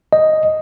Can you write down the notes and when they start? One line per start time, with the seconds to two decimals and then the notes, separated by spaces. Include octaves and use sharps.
0.13 D#5